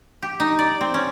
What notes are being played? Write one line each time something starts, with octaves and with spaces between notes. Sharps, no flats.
G4
D#4
D5
C4
C#4